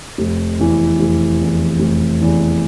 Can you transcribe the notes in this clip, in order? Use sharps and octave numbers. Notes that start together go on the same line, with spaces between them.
F1
E2 E3
F1
E2 E3
F1
E2 E3